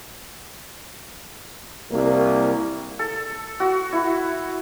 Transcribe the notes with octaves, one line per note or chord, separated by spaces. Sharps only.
C2 A#3
A4
F#4
E4